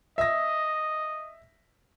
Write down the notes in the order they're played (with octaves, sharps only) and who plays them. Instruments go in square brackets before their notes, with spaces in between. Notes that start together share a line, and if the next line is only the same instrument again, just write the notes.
[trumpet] D#5 [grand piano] E5 A#6